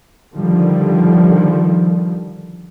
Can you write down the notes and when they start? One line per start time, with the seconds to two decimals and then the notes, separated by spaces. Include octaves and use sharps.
0.36 D3 D#3 F3 G3